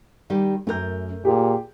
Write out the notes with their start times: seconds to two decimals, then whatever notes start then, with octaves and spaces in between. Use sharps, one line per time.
0.30 D#3 G3 G4
0.67 F#2 A3 A#4 G6
1.25 A#2 G4 G#4